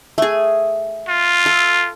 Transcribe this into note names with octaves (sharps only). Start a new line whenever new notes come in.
A3 G#4
F4
A4